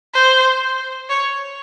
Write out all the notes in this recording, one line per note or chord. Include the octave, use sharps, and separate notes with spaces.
C5
C#5